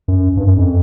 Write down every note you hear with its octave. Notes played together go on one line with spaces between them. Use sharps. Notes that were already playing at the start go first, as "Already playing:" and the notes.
F#2
G2
F#2
F2